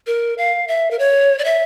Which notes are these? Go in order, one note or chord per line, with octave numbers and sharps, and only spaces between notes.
A#4
F5
E5
A#4
C#5
D5
E5